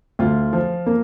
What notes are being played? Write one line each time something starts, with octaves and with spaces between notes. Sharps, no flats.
D2 F4
F3
A#3